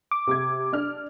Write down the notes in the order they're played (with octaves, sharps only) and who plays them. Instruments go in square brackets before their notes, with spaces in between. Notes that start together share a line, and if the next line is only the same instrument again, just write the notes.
[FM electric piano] D6
[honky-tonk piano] C3 G#6
D4 F6